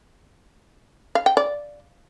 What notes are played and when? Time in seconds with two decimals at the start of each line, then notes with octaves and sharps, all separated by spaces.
1.15 F5
1.26 G5
1.37 D5